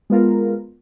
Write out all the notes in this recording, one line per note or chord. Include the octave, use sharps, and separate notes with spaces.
G#3 B3 F4 A#4